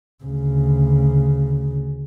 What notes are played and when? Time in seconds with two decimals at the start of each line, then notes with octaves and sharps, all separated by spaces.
0.24 D2 C#3